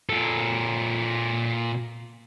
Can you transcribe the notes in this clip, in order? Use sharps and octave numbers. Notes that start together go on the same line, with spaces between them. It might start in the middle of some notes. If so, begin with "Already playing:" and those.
A#2 A4